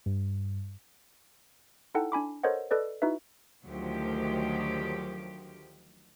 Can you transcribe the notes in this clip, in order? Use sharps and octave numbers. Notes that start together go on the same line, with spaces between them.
G2
D#4 E4 A4 F#5 G5 A5
D4 G#5 B5 D6
A4 A#4 C5 C#5 D#5 F#5
A4 B4 D5 D#5
D#4 E4 F#4 B4 E5
D2 D#3 F3 F#3 G4